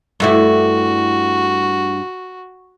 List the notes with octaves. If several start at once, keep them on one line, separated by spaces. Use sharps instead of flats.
G2 A3 E4 F#4